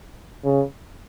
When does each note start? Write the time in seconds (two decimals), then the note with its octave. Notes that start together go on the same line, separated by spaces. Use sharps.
0.45 C#3